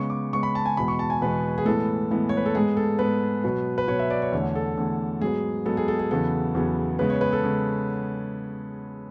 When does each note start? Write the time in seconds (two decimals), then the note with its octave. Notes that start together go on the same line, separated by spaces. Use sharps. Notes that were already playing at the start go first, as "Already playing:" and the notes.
Already playing: C#3 G#3 B3 C#6
0.10 D6
0.32 C#3 G#3 B3 C#6
0.43 B5
0.55 A5
0.66 G#5
0.77 E2 B2 G#3 B3 B5
0.88 C#6
0.99 A5
1.10 G#5
1.21 E2 B2 G#3 B3 B4
1.58 G#4
1.65 A2 E3 G#3 B3 A4
2.11 A2 E3 G#3 B3
2.29 C#5
2.37 B4
2.46 A4
2.55 G#2 G#3 B3 G#4
2.77 A4
2.99 G#2 G#3 B3 B4
3.44 B2 F#3 B3
3.78 B4
3.88 B2 F#3 B3 C#5
3.99 E5
4.10 D5
4.22 C#5
4.32 E2 D3 A3 C#5
4.56 A4
4.77 E2 D3 A3
5.21 G#2 F#3 B3 G#4
5.66 G#2 F#3 B3 A4
5.77 G#4
5.88 A4
5.99 G#4
6.11 E2 C#3 F#3 B3 A4
6.55 E2 C#3 F#3 B3
6.99 C#3 G#3 B3 B4
7.10 C#5
7.21 B4
7.33 A4
7.44 C#3 G#3 B3